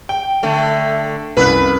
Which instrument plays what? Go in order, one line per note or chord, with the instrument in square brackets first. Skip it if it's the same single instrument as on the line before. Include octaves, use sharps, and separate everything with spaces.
[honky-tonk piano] G5
[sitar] D3 A3
[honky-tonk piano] F1 B5 B6 [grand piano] C2 F#2 F#6 [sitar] B4